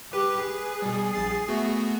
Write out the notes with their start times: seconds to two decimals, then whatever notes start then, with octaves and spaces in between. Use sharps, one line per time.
0.13 G4 B4
0.45 G#4
0.82 B2 G3
1.13 A#1 A6 C7
1.48 A3 B3 F#4